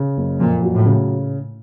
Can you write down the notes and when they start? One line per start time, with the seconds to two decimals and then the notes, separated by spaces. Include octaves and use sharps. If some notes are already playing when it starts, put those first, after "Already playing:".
Already playing: C#3
0.17 F#1
0.40 F2 A#2
0.63 F#3
0.75 A2
0.86 C#3